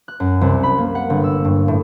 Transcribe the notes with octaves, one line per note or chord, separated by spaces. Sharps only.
F#6
F#2
C2
B5
A#3
F#5
G1
E6
G2
A2